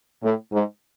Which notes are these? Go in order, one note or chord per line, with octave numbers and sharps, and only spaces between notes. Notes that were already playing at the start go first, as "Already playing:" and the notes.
A2
G#2